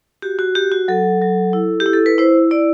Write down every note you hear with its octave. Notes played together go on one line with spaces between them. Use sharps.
F#4 G4
F#4
F#4 G4
F#4
F#3 A4
F#3
E4
G4
E4
A4
B4
E4 C5
E4 D5